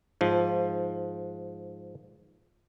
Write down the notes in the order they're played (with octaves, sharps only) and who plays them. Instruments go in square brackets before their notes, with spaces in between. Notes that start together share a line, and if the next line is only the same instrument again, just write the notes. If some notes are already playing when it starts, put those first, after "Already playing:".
[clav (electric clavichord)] G#2 F3